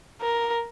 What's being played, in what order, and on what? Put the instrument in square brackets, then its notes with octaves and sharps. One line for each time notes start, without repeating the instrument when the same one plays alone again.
[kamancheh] A#4